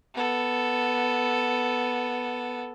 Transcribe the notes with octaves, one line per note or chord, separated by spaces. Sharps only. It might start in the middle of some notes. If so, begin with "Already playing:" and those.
B3 A4